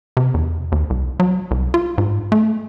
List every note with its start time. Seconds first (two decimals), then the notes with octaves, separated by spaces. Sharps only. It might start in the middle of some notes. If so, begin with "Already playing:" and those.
0.17 C3
0.34 E2
0.72 D#2
0.90 C2
1.20 F#3
1.51 C2
1.74 F4
1.98 G#2
2.32 A3